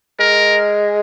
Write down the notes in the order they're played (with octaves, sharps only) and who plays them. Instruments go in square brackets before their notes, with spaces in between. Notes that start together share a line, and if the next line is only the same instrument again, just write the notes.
[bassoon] G#3 [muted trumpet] A#4